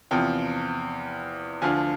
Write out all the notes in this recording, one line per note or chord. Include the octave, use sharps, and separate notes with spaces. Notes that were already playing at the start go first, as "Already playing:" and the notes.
E2 C3 F3 G5
D2 D3 F3 G#5